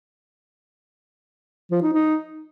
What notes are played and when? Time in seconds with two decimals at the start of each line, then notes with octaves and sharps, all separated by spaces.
1.71 F3
1.82 D#4
1.93 D#4